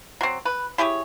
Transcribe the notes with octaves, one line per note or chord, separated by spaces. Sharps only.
F#3 C4
B4
E4 G4 G#4 C#5